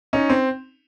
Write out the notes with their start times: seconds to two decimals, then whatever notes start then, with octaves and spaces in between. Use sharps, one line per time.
0.13 C#4 D#4
0.30 C4